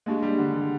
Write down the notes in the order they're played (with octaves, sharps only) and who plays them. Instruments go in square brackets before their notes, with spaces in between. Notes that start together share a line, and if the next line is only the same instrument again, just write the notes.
[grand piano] G#3 [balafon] A#3 D4 G4
[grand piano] G3
D3
D3